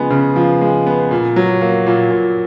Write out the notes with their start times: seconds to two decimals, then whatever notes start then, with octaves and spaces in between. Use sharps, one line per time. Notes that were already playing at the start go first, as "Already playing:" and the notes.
Already playing: C#3 F3 G#3 B3
0.10 C#3
0.36 F3
0.61 G#3
0.87 B3
1.11 A#2
1.36 F#3
1.61 A#3
1.87 A#2
2.11 A#2